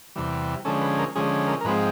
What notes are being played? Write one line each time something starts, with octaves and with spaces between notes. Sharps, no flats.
E2 C3 E3 G3
D3 F3 G#3 C#4 A4
B4
A#4
D3 F3 G#3 C#4 G#4
A#4
A#4
G#2 F3 G#3 C4 B4